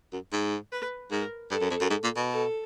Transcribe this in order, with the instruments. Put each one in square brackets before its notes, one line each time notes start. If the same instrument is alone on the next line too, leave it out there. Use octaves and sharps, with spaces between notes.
[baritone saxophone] F#2
G#2
[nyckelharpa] B4
[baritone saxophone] G#2 [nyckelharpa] A#4
[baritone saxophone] G2 [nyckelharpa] A4
[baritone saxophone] F#2
F2
F#2
G#2
A#2
B2
[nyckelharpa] A4